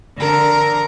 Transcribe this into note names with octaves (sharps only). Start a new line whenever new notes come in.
D3 A#4